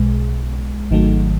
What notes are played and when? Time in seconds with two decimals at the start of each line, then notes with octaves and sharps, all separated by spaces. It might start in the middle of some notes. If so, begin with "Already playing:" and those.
Already playing: B1 B2 G#3
0.91 G#1 G#2 D#3 F#3 A3